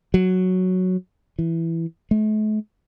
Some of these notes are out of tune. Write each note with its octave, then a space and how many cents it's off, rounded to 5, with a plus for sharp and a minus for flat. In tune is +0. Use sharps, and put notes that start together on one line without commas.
F#3 -5
E3 +5
A3 -45